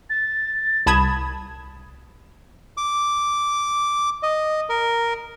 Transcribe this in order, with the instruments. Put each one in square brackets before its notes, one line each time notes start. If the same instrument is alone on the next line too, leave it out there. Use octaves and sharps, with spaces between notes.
[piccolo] A6
[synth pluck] C2 A5 B5 D#6 G#6 E7
[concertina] D6
D#5
A#4